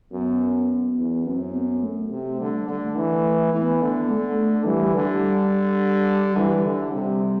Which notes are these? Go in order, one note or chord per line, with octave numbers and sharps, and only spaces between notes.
F#2 B3
E2
F#2 C4
B3
A3
C3
D3 G3
D3 A3
E3
E3 B3
D3
A3
E3 G3
D3 G3
E3 G3
D3
C3